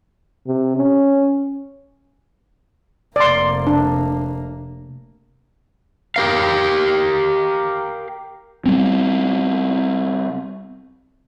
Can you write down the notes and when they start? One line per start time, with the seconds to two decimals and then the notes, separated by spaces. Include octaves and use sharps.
0.47 C3
0.76 C#4
3.16 F1 A#3 D5 C6
3.67 D4
6.16 G4 A#4 F5
8.66 G3 B3 C4